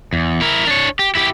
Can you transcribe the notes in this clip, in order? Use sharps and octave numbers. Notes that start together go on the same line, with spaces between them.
E2
E4 A#4
D4 C#5
G4
E4 G4